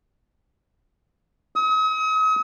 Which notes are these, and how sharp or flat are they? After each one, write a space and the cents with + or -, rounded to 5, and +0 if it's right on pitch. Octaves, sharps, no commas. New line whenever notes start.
D#6 +40